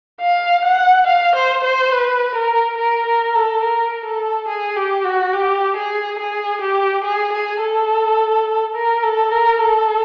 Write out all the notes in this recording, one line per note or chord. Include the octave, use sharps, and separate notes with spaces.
F5
F#5
F5
C5
C5
B4
A#4
A#4
A#4
A4
A#4
A4
G#4
G4
F#4
G4
G#4
G#4
G4
G#4
G#4
A4
A#4
A4
A#4
A4